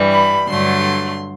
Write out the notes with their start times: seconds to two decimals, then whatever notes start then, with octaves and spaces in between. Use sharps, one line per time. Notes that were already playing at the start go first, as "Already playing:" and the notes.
Already playing: G2 E3 G3
0.11 B5
0.48 G2 D3 F#3 A3 C6